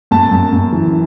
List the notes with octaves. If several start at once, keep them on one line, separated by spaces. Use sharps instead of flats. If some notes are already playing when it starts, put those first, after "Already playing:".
F#2 A5
F#2
F#2
E3